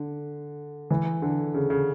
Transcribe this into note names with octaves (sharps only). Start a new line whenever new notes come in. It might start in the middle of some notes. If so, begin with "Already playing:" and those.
Already playing: D3
E3
D3
C#3
C#3